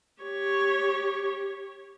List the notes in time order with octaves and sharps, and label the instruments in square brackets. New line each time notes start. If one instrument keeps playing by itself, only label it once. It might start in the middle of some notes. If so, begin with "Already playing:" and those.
[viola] G4 C#5